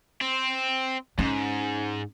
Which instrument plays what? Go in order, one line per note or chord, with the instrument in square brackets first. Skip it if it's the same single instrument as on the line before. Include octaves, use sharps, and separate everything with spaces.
[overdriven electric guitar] C4
[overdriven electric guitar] G#2 [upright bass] C#4